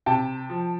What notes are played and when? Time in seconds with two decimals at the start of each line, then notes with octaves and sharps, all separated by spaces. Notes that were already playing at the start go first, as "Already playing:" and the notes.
0.06 C3 G5 A5
0.50 F3